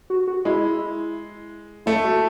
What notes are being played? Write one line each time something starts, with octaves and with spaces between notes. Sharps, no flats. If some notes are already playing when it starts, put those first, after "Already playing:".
F#4
F#4
G#3 E4
A3 E4
F#4